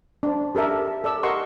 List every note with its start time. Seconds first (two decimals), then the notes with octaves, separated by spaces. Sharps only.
0.23 D4 C5
0.55 G4 A4 A#4 E5
1.04 A4 D5 E6
1.23 G4 A#4 D#5 F#5 C6 C#6